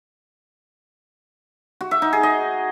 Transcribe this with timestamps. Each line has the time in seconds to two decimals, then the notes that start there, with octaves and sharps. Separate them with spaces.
1.81 F#4
1.91 E5
2.02 D#4
2.13 G#4
2.23 D#5